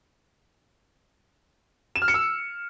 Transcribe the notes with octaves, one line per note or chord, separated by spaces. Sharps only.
E7
F6
C#7
E6